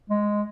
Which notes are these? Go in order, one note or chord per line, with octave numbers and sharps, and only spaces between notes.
G#3